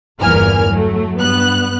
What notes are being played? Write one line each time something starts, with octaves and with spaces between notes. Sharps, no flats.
G1 E2 A#2 A#4 G#5 F6
F#3 A3
G2 B3 F#6